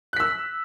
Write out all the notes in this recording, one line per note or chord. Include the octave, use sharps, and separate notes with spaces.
E6 F#6 B6